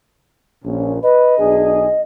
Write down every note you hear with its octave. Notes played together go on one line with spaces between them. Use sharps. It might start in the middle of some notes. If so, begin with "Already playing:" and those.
A#1 A#2 C#4
B4 D#5
B1 D4 G#4